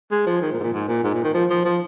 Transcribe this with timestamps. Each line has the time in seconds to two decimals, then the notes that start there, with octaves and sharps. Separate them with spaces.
0.12 G#3
0.26 F3
0.42 D#3
0.52 A#2
0.59 G#2
0.63 A#2
0.73 G#2
0.88 A#2
1.04 G#2
1.14 A#2
1.24 D#3
1.34 F3
1.50 F3
1.65 F3